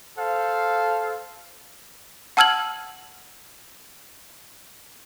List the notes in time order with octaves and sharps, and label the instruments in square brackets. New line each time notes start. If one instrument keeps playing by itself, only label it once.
[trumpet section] A4 C5 F5
[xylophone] F#5 A5 E6 F6 G#6 F#7